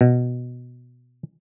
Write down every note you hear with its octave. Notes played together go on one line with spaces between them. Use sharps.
B2